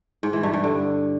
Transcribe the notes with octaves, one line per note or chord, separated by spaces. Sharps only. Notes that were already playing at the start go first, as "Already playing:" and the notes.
G#2
E3
G2
G2
D3